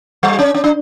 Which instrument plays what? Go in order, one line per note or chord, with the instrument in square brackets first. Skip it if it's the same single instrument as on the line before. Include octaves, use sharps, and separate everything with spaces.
[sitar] G3
C#4
C#4
D4